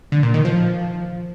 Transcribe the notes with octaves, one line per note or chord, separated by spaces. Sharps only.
D3
A#2
D#3
F3